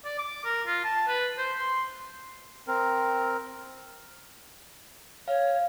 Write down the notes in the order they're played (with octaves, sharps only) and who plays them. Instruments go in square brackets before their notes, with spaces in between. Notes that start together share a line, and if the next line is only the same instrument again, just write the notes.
[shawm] D5
D6
A#4
F4
A5
B4
C5
C6
[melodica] C4 A#4
[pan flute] C#5 [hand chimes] F5